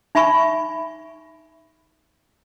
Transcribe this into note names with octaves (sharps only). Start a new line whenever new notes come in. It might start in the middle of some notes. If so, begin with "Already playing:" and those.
D#4 E5 G#5 B5 C#6